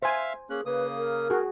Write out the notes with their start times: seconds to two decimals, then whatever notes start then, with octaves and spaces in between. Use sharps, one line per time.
0.02 C5 E5 F5 G#5
0.50 A#3 C#4 G#4 F#6
0.66 C#3 A#3 B4 D#6
0.97 A#4
1.30 F#4 G#4